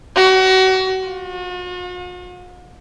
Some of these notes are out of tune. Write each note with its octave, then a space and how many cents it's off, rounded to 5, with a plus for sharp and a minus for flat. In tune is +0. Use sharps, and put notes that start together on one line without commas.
F#4 +30
F#4 -45